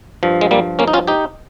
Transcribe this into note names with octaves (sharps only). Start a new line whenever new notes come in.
G2 F3
G#3
G3 A#3
A#3 C#4
D#4
C#4 F4
D#4 G4